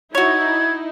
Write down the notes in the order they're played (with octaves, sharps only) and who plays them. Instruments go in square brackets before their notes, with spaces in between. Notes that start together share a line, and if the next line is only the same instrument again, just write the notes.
[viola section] D#4 E4 [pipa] F#4 C#5 [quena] G#6